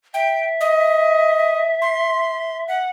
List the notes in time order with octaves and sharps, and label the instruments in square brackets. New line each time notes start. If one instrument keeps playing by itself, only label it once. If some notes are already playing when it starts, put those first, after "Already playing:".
[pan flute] E5 [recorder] G5
[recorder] D#5
C6
F#5